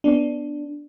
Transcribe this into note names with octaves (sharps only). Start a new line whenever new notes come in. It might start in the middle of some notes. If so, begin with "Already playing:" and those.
B3 D4